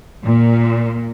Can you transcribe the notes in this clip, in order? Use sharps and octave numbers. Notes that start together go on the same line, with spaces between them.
A#2